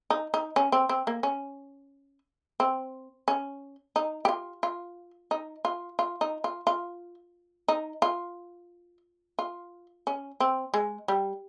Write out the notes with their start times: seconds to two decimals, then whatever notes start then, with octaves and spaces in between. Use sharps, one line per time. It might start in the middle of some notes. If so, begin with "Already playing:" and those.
0.10 D#4
0.34 D#4
0.56 C#4
0.72 C4
0.89 C4
1.07 A#3
1.23 C#4
2.60 C4
3.28 C#4
3.96 D#4
4.25 G4
4.29 F4
4.63 F4
5.31 D#4
5.65 F4
5.99 F4
6.21 D#4
6.44 F4
6.67 F4
7.68 D#4
8.02 F4
9.39 F4
10.07 C#4
10.40 C4
10.74 G#3
11.08 G3